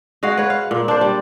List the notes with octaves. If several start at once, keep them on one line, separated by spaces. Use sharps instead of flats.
G#3 F#4 F5
B4 C#5
F5
A#2
D4 C5
G3